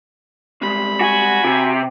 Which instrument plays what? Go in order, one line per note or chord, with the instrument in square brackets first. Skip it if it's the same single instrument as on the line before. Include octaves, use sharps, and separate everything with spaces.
[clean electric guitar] G3 G#3 C4 [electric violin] B5
[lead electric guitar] F#4 [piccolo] G#5
[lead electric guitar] C3 [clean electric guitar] F#4 F#5